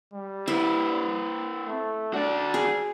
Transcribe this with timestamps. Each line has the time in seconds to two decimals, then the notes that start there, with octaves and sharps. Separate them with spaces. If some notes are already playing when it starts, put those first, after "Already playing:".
0.14 G3
0.48 C4 E4 B4
1.66 A3
2.14 D4 F#4 D5
2.54 G#4